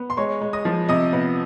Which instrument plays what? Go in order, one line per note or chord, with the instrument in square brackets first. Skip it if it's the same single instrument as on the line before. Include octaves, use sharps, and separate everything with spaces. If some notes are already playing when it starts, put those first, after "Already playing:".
Already playing: [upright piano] B3
C6
G#3 C#5 C#6
G#3
D#5 D#6
F3
C3 D#5 D#6
B3